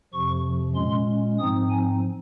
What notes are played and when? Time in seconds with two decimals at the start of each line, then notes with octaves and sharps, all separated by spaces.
0.13 F2 C3 F3 C#6
0.75 A#2 G#3 C#4 C6
1.38 G#2 F3 C4 D#4 D#6
1.70 G#5